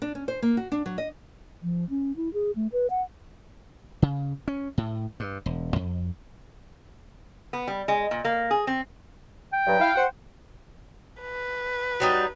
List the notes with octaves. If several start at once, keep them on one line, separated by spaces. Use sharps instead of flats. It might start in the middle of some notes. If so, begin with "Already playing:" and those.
D4
C#4
C5
A#3
F#4
D4
F#3
D#5
F3
C#4
E4
G#4
A3
B4
F#5
C#3
C#4
A2
G2
E1
F2
B3
G3
G#3
A#2
A#3
G#4
C4
G5
G2 F#3
E4 F5
F#4 C5 F#5
B4
F#3 G3 D#4